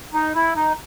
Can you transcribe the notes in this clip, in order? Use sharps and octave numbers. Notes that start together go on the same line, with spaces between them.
D#4
E4
D#4